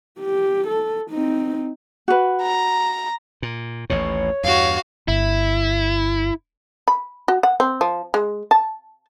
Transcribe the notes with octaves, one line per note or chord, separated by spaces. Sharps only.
G4
A4
C4 D#4
F#4 B4
A#5
A#2
A1 D#2 A2 C#5
E2 G2 F#4 F5
G1 E4
B5
F#4
F#5
C4
F3
G#3
A5